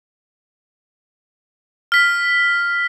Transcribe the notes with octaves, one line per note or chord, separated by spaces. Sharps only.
F6 B6